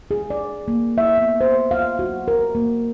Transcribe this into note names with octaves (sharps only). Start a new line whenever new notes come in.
G#4
D5
A#3
E5
B3
C5
F5
F#4
A#4
A#3